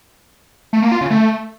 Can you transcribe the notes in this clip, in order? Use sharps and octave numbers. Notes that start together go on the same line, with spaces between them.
A3
A#3
F4
C#3
A3